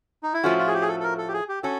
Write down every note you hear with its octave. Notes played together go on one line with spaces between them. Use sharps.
D#4
E4
A2 F3 A3 C#4 F4 F#4
F4
G#4
G4
G#4
A4
A4
A#4
A4
G4
G#4
G4
C#4 F#4 A4